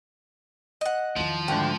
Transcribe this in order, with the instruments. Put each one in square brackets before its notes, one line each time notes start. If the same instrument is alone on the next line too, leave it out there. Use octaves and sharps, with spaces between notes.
[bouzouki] D#5 F#5
[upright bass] E2 D#3 [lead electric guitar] F3
[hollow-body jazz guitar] D2 G#2 D3 [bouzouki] G5